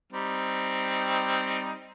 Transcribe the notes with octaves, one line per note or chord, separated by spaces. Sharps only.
G3 C4 D#4